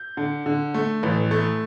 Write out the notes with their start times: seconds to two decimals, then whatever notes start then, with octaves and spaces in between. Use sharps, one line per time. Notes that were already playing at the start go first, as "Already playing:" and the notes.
Already playing: G6
0.17 D3
0.46 D3
0.74 A3
1.03 A1
1.31 A3